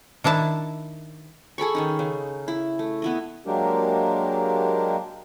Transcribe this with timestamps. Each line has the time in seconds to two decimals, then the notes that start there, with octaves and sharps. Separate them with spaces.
0.24 D#3 D4 E4 A5
1.58 G#4 A4 B5 C#6
1.75 D#3 C#4 D#4
1.99 C#3
2.48 E4
2.79 A3
3.02 B3 E4 D#5
3.46 F#3 G#3 A#3 D4 G4 A#4